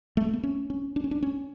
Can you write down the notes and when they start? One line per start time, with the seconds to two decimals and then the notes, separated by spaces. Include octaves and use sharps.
0.17 A3
0.33 B3
0.43 C#4
0.70 C#4
0.96 D4
1.04 C#4
1.11 D4
1.22 C#4